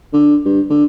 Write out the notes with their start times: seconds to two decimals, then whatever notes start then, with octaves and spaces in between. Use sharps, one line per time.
0.13 D3
0.45 G2
0.70 D3